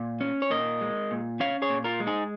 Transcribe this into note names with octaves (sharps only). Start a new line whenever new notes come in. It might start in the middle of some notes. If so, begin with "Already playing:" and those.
Already playing: A#2
C#4
C#5
A#2 A#4 D#5
G#3
A#2
C#4 C#5 F5
G#4 C#5
A#2
F4 A#4
G#3
D#4 G#4